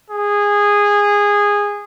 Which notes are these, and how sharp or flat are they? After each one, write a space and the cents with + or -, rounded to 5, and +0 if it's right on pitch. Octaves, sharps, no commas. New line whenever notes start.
G#4 -15